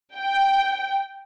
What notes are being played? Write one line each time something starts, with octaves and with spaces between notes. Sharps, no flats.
G5